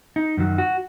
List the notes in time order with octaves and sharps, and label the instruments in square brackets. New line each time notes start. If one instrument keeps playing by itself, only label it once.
[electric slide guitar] D#4
F#2 D#3 F#3
F#4